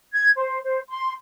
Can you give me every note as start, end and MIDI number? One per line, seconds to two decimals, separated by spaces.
0.13 0.30 92
0.36 0.58 72
0.64 0.79 72
0.89 1.11 84